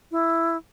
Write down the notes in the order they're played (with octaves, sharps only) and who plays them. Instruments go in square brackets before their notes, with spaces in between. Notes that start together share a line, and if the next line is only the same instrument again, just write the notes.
[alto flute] E4